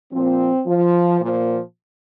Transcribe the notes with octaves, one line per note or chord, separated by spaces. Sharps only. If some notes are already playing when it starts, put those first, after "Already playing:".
A#2 F3 C4
F3
A#2 F3